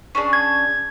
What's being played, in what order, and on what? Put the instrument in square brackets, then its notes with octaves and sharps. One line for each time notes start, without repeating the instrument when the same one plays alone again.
[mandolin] C#4 D4 G#4
[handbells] G#6